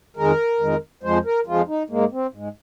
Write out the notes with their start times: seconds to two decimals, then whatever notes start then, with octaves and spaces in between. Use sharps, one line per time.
0.17 F2 D#3 G#3 A#4
0.60 F2 D#3 G#3
1.03 F2 F3 G#3 C5
1.25 A#4
1.47 F2 F3 G#3 F4
1.68 D#4
1.90 G#2 G#3 A#3
2.12 C4
2.33 G#2 G#3